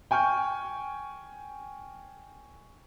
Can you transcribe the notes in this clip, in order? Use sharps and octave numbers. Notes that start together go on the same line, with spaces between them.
G5 G#5 C#6 F6 G6